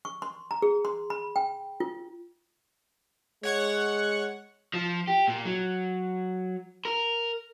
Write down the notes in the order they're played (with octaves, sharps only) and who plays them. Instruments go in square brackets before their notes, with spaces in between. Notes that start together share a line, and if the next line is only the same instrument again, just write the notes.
[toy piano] C#6
C6
A#5
G#4
C6
B5
G5
F4
[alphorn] G#3 [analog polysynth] C#5 F#5 C#6
[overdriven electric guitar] F3
G4
A#2
F#3
A#4